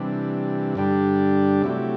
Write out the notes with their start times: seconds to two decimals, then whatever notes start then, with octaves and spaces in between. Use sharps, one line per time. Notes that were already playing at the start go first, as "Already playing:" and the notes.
Already playing: C3 E3 G3 D4
0.75 G2 D3 G3 D4 G4
1.62 C3 F#3 A3 E4 G4